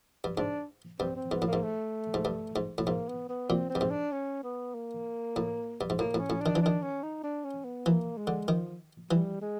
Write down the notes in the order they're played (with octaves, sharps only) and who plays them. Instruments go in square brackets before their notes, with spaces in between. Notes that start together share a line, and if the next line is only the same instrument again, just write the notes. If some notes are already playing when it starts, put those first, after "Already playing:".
[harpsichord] G2
[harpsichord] G#2 [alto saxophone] D4
[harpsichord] G2 [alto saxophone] C4
[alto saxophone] C4
[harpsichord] G#2 [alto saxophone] B3
[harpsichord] A2 [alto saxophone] A#3
[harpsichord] G#2
[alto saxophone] A3
[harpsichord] G#2
G2
G#2
A2
[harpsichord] G#2 [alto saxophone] A#3
[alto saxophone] B3
B3
[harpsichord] A#2 [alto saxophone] C4
[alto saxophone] C4
[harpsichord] G2
G#2
[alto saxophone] D4
C#4
B3
A#3
[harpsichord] A2
G2
G#2
[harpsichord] A2 [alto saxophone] A#3
[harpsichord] A2
[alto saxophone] C#4
[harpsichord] A2
[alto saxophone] D4
[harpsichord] D#3
E3
[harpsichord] D#3 [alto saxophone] D4
[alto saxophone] C#4
D#4
D4
C#4
B3
[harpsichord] E3 [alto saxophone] A#3
[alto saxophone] G#3
[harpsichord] D3
[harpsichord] D#3 [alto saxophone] F3
[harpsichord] E3 [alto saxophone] G3
[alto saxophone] G#3